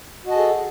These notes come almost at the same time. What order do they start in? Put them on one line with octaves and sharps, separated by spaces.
F#4 D#5 A5 G#4 A4